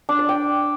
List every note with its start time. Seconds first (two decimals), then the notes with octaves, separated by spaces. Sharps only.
0.09 D4
0.19 D5
0.29 G5